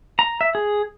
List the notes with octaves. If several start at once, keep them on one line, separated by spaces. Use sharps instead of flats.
A#5
E5
G#4